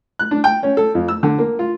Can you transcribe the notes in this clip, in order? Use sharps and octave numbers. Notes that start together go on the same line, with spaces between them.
F#6
D4
G5
C#4
A4
F2
E6
D3
A#3
F4